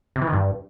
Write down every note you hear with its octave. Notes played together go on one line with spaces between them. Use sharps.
C3
E3
D#3
G2